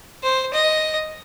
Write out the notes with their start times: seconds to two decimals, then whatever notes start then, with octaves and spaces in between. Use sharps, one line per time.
0.23 C5
0.53 D#5